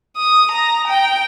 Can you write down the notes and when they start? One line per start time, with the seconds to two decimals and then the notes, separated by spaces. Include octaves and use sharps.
0.17 D#6
0.51 A#5
0.87 G5